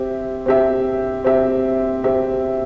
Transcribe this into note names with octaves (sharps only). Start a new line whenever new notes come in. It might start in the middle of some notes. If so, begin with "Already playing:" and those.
Already playing: C4 G4 E5
C4 G4 E5
C4 G4 E5
C4 G4 E5